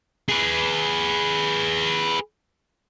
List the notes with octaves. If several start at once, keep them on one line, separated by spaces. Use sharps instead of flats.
G#4 B4